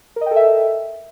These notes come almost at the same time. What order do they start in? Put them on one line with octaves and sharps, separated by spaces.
A#4 D#5 G5 A4 E5